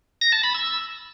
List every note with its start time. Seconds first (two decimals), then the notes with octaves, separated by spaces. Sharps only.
0.21 A#6
0.32 A5
0.43 B5
0.54 E6